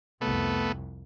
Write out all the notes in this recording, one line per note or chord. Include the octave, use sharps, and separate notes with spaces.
C2 F2 A3 B3